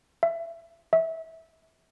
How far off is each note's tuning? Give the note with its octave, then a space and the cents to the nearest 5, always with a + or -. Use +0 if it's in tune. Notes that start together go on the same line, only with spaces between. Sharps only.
E5 +25
E5 -20